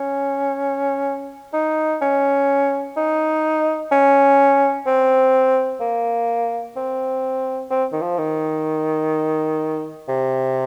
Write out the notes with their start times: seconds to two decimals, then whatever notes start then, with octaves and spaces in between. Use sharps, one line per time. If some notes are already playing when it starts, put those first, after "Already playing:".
Already playing: C#4
1.53 D#4
2.02 C#4
2.96 D#4
3.92 C#4
4.86 C4
5.80 A#3
6.76 C4
7.70 C4
7.92 D#3
8.02 F3
8.18 D#3
10.08 C3